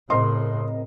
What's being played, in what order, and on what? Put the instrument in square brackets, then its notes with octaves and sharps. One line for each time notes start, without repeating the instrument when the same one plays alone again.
[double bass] A2 C#3 [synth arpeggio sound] C4 A#4 D#5 [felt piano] C6